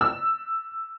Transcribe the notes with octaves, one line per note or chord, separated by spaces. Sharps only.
E6